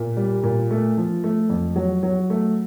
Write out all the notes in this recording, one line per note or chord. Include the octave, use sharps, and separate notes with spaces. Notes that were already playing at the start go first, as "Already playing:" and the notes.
Already playing: A#2
G3
A#2
A3
F3
A3
F2
F#3
F#3
A3